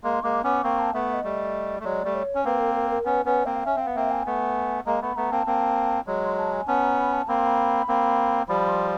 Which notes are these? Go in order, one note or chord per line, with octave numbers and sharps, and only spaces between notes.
G#3 A#3 C6
G#3 A#3 D6
B3 C#4 D6
A#3 C4 C#6
A5
A3 B3 E5
E5
D#5
G3 A3
A3
F#3 G#3 D5
G3 A3
C#5
C#4
A#3 C4 B4
A#4
A#4
A#4
B3 C#4 B4
B3 C#4 B4
A#3 C4 F5
F5
C#4 E5
C4 F5
B3
A#3 C4 E5
G#5
A3 B3
G#3 A#3 A#5
A3 B3 B5
A3 B3 A#5
A#3 C4 A5
A#3 C4
F#3 G#3
C6
A5
G#5
B3 C#4 A5
A#5
B5
A5
A#3 C4 B5
C6
B5
A#3 C4
F3 G3 B5
C6